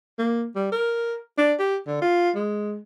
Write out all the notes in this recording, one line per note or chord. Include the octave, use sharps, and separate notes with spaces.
A#3
G3
A#4
D4
G4
D3
F4
G#3